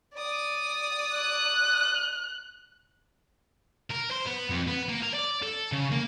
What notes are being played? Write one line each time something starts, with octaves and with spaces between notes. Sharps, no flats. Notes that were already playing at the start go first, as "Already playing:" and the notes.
D5 D#6
F#6
A#4
C5
B3
F2
B3
A#3
A#4
D5
A4
C#3
A#3